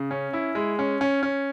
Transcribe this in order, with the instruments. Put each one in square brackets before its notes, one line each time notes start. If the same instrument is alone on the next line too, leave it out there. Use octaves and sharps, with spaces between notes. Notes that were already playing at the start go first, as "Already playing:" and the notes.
Already playing: [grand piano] C#3
C#4
E4
G#3
C#4
C#4
C#4